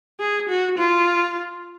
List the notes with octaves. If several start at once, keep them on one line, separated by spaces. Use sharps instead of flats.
G#4
F#4
F4